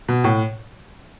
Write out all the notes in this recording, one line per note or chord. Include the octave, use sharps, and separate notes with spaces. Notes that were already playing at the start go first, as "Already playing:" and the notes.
B2
A2